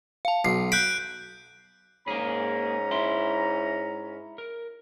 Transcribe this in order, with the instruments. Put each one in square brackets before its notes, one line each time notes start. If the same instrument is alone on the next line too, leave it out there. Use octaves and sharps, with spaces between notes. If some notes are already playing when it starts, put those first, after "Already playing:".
[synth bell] F5 A5
[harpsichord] B1 [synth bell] C7
[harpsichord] B5 [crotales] F#6 G6 D7
[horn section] G#2 C#4 A#5 [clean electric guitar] A#3 G#4
[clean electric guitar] E4 E5 C6
A#4